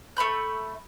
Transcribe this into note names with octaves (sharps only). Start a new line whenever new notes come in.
A3 E5 B5 G6